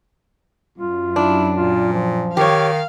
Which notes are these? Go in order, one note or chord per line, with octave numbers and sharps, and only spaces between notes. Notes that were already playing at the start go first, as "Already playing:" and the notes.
F#2 F4
D4 E4
A#2 F4
F3
D#3 G4 C#5 F5